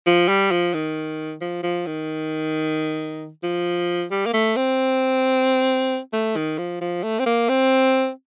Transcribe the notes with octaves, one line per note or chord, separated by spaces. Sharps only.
F3
G3
F3
D#3
F3
F3
D#3
F3
G3
A#3
A3
C4
A3
D#3
F3
F3
A3
C4
A#3
C4